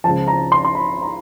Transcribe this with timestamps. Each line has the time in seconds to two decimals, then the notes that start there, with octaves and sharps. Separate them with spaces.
0.04 C#2 C#3 F3 A5
0.28 A#5
0.52 C6
0.65 C6
0.75 B5
1.02 A#5